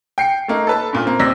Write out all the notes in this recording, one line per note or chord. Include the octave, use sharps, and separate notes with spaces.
G5 C7 C#7
A3 A#3 D#4
A4 B4 A5
G2 A#2 F4
A#3 C4
D#2 C4 D5 E6 A#6 B6